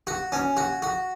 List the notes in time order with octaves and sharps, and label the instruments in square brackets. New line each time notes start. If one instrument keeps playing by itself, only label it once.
[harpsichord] F#4
C#4
F#4
F#4